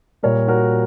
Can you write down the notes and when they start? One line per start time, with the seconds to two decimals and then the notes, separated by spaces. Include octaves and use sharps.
0.23 A#2 G3 A#4 C#5
0.48 F#4 A#4